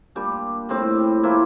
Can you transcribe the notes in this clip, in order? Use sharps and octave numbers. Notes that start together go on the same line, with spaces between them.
A#2 G3 D4 G4
A2 G3 C4
F3 A#3 E4